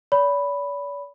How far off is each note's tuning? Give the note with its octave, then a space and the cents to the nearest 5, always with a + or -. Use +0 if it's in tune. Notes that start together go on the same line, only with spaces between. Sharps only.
D5 -45 B5 +0